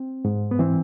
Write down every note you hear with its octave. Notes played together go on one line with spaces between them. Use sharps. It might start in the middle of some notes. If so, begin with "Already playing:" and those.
Already playing: C4
G#2
B3
E3 C4